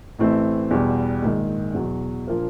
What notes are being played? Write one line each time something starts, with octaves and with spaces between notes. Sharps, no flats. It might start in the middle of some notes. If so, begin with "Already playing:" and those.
A1 A2 E3 A3 C4
E2 B2 G3
A#1 G#2 D#3
E2 B2 F#3
A#2 F3 A#3 D4